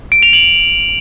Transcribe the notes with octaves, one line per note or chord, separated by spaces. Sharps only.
D7
F7
F#7